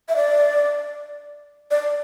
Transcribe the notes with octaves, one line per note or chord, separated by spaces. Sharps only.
E5
D5
D5